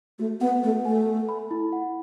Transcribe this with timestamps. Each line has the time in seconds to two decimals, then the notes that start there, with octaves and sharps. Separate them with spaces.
0.19 A3 F#4
0.41 B3 F#5
0.63 A3 B4
0.85 A3 G#5
1.07 A4
1.29 B5
1.51 E4
1.73 F#5